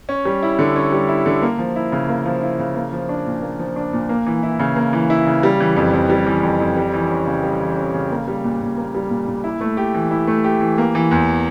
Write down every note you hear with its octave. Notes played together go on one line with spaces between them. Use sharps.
C#4
G3
E4
D3
C#4
G3
E4
D3
A#3
F3
E4
C#3
A#3
F3
E4
C#3
A#3
F3
D4
A#2
A#3
F3
D4
A#2
A#3
E3
E4
C#3
A#3
E3
E4
C#3
G3
E3
F2
F2
G3
E3
F2
F2
G3
E3
C#4
C#3
G3
E3
C#4
C#3
A#3
G3
A#2
A#2
A#3
G3
A#2
A#2
E4
A3
G4
E3
E4
A3
G4
E3
A#3
E3
E2